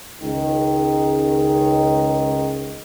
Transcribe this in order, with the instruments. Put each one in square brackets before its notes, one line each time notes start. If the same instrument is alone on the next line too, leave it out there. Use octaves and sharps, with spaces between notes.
[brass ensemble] C#2 D#3